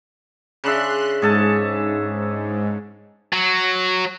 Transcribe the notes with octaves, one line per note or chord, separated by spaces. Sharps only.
C#3 D4 E5 C6 F#6
G#2 G#4 A4 A5
F#3